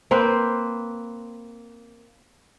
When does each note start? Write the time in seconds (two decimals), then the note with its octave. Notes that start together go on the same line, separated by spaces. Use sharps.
0.11 A#3 C4 B4 C5